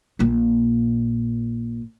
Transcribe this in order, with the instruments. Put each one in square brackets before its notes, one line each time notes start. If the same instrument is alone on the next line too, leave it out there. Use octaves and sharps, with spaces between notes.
[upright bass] A#1 A#2